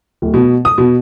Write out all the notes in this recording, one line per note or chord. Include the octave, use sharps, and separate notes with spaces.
D1
B2
D#6
B2